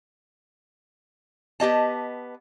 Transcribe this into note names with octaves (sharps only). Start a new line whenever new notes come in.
B3 G4 D#5 A5